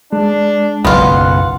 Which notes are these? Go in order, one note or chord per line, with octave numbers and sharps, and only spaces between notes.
G#3 D4
F#1 B1 E2 B3 F4 F#5